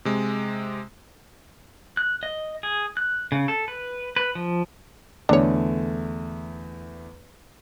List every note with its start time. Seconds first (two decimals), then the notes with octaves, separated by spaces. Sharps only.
0.05 C3 G#3
1.97 F#6
2.23 D#5
2.63 G#4
2.97 F#6
3.32 C#3
3.48 A4
3.68 B4
4.16 B4
4.35 F3
5.29 E2 D3 A3 D4 C#5